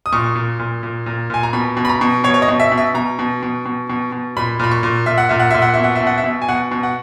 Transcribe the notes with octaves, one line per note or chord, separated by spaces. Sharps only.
D#6
A#2 C#6
A#2
A#2
A#2
A#2
A#2 G#5
A#5
B2 B5
B2
B5
A#5
B2
B2 C#5
C#5
D#5
B2
E5
B2
E5
B2 A#5
B2
B2
B2
B2
B2
A#2 B5
A#2 B5
C#6
A#2
A#2 E5
F#5
A#2 E5
F#5
A#2 E5
F#5
B2 E5
F#5
E5
B2
F#5
E5
B2
G#5
B2 F#5
B2
F#5